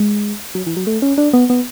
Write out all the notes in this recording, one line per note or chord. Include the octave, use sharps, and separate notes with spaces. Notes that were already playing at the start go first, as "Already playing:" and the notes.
Already playing: G#3
F#3
E3
F#3
A3
C#4
D4
B3
B3